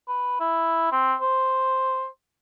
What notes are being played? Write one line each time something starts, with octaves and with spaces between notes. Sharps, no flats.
B4
E4
C4
C5